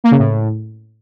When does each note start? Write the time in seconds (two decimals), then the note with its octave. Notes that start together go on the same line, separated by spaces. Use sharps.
0.04 A#3
0.11 C#3
0.19 A2